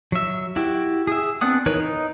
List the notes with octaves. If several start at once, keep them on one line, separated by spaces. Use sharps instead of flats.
F#3 E5
E4 F#4 G4
G#4 E5
B3 C4 D4 F#5 D#6
E3 D#4 A#4 B4 C#5
D#4